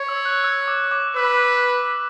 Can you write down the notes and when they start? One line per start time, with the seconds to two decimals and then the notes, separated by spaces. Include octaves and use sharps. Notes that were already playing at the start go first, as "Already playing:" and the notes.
Already playing: C#5
0.09 E6
0.25 F#6
0.44 E6
0.68 D6
0.91 D6
1.15 B4 E6